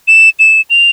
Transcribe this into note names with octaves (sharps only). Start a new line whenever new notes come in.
E7
E7
F7